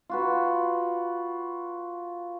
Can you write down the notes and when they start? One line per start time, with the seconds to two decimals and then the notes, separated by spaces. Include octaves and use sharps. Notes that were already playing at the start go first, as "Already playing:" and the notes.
0.09 F4 F#4 B4